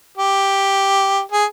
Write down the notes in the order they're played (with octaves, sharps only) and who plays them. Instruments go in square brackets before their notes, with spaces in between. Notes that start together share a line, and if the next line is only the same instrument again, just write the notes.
[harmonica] G4
G#4